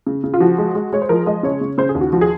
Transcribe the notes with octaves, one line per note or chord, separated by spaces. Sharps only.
C#3
C#3
F4
F3 F#4
G#3
G#3
G#3 C#5
C5
F3 A#4
G#3 D#5
C#3 C#5
C#3
C#3 C5
G#4
D#2
F#4
F3 F#4
G#4